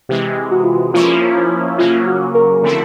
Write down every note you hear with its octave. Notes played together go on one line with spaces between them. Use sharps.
C3 E3 G#3 G4
F#4
F4
F#4
F3 A#3 C#4 E4 F4
C#3 F#3 A#3 C#4 F4
F#4
A#4
D3 F3 A3 C4 E4